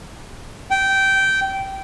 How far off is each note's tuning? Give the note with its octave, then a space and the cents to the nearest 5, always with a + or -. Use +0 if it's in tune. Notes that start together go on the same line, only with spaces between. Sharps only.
G5 -15